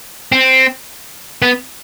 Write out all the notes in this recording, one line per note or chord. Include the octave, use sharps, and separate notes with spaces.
C4
B3